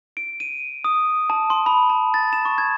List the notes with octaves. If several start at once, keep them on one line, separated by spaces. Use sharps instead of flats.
D7
D#7
D#6
A5
C6
B5
A5
A6
E7
C#6
G#6